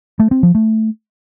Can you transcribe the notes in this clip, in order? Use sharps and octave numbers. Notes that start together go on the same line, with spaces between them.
A3
C4
F3
A3